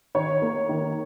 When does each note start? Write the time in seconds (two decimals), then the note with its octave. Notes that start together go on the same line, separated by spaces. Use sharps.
0.15 D#3 C#5
0.42 A#3
0.69 D#3